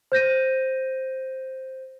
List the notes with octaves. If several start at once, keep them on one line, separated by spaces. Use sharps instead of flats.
C5 G6 A#6 D#7